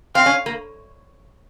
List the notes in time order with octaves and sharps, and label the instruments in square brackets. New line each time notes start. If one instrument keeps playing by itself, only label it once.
[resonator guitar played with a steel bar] C4 [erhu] F5
[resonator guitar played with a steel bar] C#4
A#3